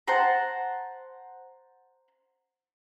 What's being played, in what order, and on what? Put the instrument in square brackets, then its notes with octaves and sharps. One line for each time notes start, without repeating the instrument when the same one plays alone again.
[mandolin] C5 F#5 A5 A#5